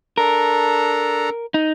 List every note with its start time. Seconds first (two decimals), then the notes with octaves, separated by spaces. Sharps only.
0.18 D4 A4 A#4 A#5
1.54 D#4